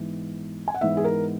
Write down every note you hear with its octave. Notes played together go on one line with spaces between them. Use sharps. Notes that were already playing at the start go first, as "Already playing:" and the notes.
Already playing: G#2 E3 G#3 B3
G#5
F#5
G#2 E3 G#3 B3 E5
G#4
A#4